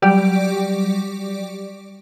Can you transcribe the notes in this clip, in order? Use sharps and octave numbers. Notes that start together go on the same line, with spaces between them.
F#3 G3 G4 D5